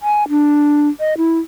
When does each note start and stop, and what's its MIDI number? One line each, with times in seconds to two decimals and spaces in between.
0.01 0.28 80
0.29 0.88 62
1.00 1.14 75
1.18 1.39 64